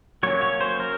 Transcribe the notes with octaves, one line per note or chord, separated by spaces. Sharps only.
F#3 A#3 C#4 C#5
C#5
C5
A#4